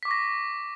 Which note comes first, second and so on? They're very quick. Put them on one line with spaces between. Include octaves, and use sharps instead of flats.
B6 D6 C#6 A#6